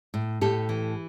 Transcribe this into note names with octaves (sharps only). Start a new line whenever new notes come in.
A2
A2 G4 A4
E3